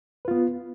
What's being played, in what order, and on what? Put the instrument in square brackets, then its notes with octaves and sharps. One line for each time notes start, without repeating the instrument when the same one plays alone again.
[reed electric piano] B4
F4
B3